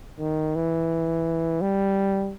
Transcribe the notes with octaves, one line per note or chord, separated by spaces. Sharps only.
D#3
E3
G3